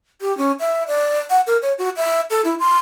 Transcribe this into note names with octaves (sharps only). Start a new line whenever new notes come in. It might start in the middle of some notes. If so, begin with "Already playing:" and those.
G4
C#4
E5
D5
F#5
A#4
C#5
F#4
E5
A4
E4
C6